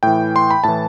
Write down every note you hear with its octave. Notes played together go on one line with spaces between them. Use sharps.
A2 E3 G5
C6
B5
A2 E3 A5